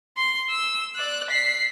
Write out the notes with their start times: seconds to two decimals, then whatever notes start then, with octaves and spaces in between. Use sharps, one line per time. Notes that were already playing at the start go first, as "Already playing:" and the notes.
0.17 C6
0.50 E6
0.96 D5 F#6
1.31 B6 C7